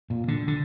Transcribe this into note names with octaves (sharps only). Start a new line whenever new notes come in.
A#2
D3
D3